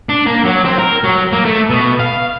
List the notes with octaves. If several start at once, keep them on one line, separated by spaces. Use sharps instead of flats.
D4
A#3
F#3
C4
A#4
F#3
A#3
A3
B2
F5